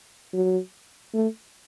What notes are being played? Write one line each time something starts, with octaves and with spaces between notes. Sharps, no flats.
F#3
A3